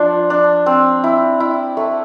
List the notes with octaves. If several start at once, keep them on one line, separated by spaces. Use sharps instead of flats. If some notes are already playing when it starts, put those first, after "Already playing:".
Already playing: F3 D4
D4
C4
E4
E4
A3